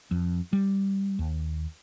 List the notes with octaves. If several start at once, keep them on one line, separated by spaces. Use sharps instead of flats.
F2
G3
D#2